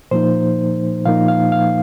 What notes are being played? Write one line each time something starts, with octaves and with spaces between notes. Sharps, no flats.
A#2 F3 A#3 D#4 C5
A#2 F3 A#3 D#4 F5
F5
F5